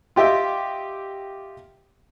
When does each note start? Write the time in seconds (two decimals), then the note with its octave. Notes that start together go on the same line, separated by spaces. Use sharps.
0.16 F4 G4 D#5 E5 G5